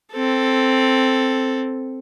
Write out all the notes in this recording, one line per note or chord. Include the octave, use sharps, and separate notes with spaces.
C4 A4